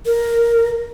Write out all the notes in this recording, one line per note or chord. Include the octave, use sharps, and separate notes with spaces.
A#4